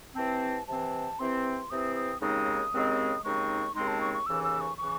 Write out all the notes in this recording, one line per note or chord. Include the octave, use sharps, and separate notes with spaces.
C3 E3 C4 A5
C3 E3 C4 A5
C3 E3 C4 C6
C3 E3 C4 D#6
D#6
D#2 C#3 G#3 C4 D#4 D#6
D#2 C#3 G#3 C4 D#4
D#2 C#3 G#3 C4 D#4 C#6
D#2 C#3 G#3 C4 D#4 C6
A5
C#6
C#6
D#2 C#3 E3 E6
E6
C#6
C#3 E3 C#6